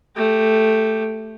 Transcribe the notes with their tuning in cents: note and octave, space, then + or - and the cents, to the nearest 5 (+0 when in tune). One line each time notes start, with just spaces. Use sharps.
A3 +0 G4 +0